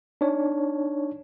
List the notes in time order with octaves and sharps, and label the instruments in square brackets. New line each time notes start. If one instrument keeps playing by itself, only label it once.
[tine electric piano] D4 D#4 C#5